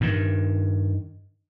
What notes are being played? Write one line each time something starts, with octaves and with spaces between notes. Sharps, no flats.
G2 D#3